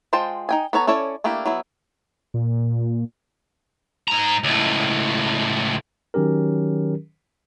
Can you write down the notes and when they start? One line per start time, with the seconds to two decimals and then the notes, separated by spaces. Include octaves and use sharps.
0.13 G#3 F4 C5 G5 A5
0.49 D#4 G5 G#5
0.73 B3 A4 C#5 A#5
0.87 C#4 E4 A4 C#5 D5
1.24 A3 A#3 D4 E4 G4
1.45 F#3 B3 E4
2.34 A#2
4.08 G#2 A#5
4.44 C#2 A2
6.14 D#3 F#3 C#4 G4 A#4